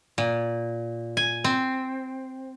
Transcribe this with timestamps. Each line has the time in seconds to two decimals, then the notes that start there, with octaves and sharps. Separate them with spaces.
0.18 A#2
1.17 G#5
1.44 C4